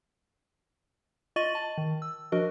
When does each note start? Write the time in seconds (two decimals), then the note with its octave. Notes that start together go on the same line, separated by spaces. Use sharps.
1.36 F4 D#5 C#6 A6 D#7 F#7
1.55 A5
1.78 D#3
2.02 E6
2.32 F3 D4 F#4 A#4 D#5